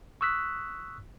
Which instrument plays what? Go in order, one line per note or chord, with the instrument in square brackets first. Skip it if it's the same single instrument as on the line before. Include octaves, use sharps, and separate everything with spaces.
[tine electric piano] C#6 D#6 E6 F#6 B6